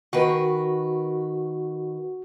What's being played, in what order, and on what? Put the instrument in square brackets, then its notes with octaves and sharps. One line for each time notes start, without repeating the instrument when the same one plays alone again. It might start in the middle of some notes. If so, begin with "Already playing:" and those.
[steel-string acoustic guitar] D#3 A#4 B4 [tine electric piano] F#4